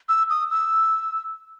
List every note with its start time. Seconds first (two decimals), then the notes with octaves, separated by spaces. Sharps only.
0.09 E6
0.30 D#6
0.50 E6